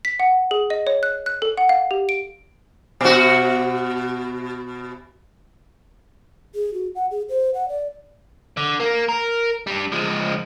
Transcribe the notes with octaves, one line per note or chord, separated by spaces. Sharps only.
B6
F#5
G#4
D#5
C#5
F#6
F#6
A4
F#5
F5
G4
D7
B2 F#4
G#4
F#4
F#5
G#4
C5
F#5
D5
D3
A#3
A#4
G3 D4
F3 G#3